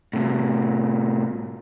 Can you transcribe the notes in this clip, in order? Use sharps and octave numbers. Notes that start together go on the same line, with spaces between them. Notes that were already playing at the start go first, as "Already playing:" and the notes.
A2 C3